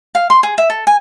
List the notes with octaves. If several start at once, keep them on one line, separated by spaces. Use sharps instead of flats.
F5
C6
G#4
E5
A4
G#5